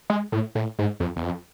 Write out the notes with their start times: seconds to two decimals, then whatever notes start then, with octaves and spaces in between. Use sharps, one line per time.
0.10 G#3
0.32 A2
0.55 A2
0.79 G#2
1.00 F2
1.16 E2
1.23 F2